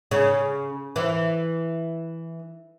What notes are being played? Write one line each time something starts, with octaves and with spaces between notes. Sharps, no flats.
C#3
E3